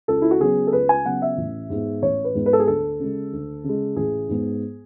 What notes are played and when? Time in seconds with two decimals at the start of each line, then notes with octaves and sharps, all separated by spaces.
0.08 C#2 A4
0.22 E4
0.31 F#4
0.40 C#3 F#3 B3 G#4
0.67 A4
0.73 C#2 B4
0.89 G#5
1.05 C#3 F#3 B3 F#5
1.22 E5
1.37 A1
1.70 G#2 G#3 B3
2.02 A1 C#5
2.24 B4
2.35 G#2 G#3 B3
2.46 B4
2.53 A4
2.59 G#4
2.67 D2 A4
3.00 C#3 G#3
3.33 D2
3.64 C#3 G#3
3.96 A1 G#4
4.29 G#2 G#3 B3